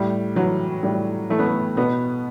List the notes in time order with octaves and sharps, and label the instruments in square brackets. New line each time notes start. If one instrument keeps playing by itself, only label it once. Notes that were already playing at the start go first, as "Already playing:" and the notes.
Already playing: [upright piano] A2 G3
E3 F#3
A2 G3
E3 A3
B3
A3
B2 B3